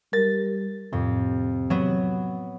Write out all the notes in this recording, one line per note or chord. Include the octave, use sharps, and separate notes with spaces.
G3 A#4 A6
F2 A2 C3
F#3 B3